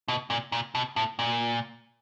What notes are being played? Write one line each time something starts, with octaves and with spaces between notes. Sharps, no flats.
B2
A#2
A#2
B2
A2
A#2